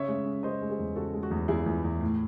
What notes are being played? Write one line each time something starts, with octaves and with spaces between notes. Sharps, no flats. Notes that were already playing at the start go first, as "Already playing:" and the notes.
Already playing: C#3 C#5 E5
G#3
C#4
C#3 C5 D#5
G#3
G#4 C5
E2
C#3 F#4 A4
G#3
F#4
E2
E2 E4 G#4
E2
E2
A2